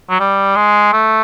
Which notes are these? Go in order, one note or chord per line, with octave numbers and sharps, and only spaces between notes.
F#3
G3
G#3
A3